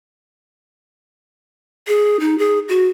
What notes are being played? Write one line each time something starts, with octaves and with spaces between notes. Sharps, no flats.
G#4
D#4
G#4
F#4